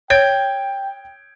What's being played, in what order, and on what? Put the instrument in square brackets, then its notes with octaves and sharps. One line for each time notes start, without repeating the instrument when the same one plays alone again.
[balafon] C#5 [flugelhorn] G5 [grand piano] G6 G#6 D7